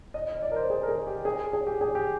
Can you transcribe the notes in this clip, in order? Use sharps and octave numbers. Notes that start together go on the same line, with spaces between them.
D#5
D#5
D5
A#4
C5
G#4
A#4
G#4
G4
G#4
G#4
G4
G#4
G4